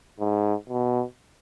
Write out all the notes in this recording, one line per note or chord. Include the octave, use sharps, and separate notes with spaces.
G#2
B2